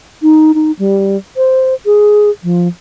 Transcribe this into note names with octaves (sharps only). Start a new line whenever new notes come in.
D#4
D#4
G3
C5
G#4
F3